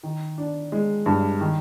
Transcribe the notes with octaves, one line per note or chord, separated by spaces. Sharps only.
D#3
D4
G#3
G2
D#3